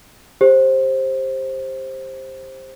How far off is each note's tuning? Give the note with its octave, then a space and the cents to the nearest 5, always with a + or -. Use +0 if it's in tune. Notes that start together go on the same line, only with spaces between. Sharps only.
G4 +20 C5 +15